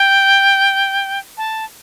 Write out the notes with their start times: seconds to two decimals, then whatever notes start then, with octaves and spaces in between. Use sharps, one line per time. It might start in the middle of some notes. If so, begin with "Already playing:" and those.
Already playing: G5
1.38 A5